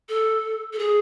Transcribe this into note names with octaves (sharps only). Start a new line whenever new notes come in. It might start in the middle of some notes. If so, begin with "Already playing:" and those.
A4
A4
G#4